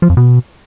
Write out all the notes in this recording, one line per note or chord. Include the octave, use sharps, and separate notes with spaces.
F3
F2
B2